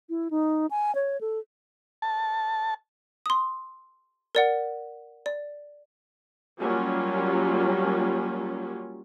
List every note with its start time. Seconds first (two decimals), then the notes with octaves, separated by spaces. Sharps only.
0.09 E4
0.31 D#4
0.71 G#5
0.95 C#5
1.21 A4
2.02 A5
3.26 C6 D#6
4.35 A#4 D5 F#5
5.26 D5
6.59 F#3 G3 A#3 C#4 F4